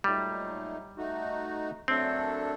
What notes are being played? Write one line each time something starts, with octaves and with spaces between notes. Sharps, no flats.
A#2 F#3 G3 A3 D#4
A3 D#4 F#4
F#2 F#3 A3 C4 D4 A4